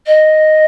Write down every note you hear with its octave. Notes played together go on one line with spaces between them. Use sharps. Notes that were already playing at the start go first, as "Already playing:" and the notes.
D#5